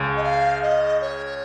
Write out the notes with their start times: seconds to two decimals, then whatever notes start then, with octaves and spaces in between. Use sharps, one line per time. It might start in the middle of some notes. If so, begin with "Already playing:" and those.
Already playing: C#2 C#3
0.16 D#5
0.23 F5
0.62 D#5
1.01 C#5